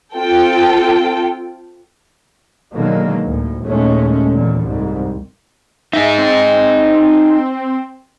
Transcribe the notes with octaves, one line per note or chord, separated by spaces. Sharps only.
C4 F4 A4 G5
B2 D3 D#3 F#3 G#3 A#3
D2 A2
D#2 A#2 G#3 A3 C#4
E2 A#2 D3
C2 F2 G#2
D#4 G#4 E5
C4